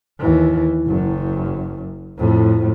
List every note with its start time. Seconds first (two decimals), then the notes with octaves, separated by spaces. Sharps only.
0.19 D#2 E3
0.86 F#1 F#2
2.18 F2 A2